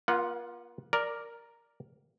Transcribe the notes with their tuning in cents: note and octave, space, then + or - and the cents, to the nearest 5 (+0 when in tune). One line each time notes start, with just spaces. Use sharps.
A#3 +45 F4 +0 F#5 +0
A#4 +0 D5 +0